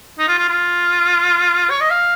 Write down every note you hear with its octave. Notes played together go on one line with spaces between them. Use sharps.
D#4
F4
F4
F4
C#5
D#5
F5